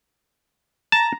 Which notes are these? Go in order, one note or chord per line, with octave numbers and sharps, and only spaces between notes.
A5 A#5 A#6